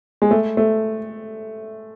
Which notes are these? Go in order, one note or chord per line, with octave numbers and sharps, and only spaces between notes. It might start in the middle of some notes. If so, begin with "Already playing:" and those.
G#3
A3
A3